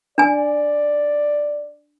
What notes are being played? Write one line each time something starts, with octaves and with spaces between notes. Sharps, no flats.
D4 D5 G#5